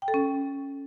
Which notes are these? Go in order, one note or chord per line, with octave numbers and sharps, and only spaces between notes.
G5
A4
C#4